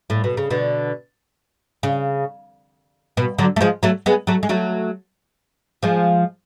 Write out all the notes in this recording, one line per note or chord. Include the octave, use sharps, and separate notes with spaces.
A2
B2
C#3
B2 D3
C#3
B2
D3 F#3
A3
F3 G#3
F#3 A3
G#3 B3
F#3 A3
G#3
F#3 A3
F3 G#3